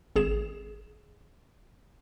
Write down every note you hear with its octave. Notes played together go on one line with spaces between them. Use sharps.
G#1 G#4 E7